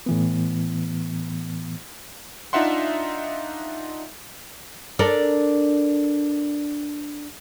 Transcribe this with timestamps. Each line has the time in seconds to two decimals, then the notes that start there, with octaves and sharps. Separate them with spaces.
0.06 A2 E3 B3
2.53 D4 D#4 F4 E5 F#5 C6
4.99 D4 A4 A#4 D5